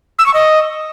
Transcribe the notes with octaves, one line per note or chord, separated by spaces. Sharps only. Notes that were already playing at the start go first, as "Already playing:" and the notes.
E6
C#6
D#5